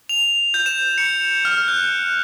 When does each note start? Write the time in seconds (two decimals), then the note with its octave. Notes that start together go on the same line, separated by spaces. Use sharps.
0.09 F7
0.54 G6
0.66 E7
0.98 C#7
1.45 F6
1.68 F#6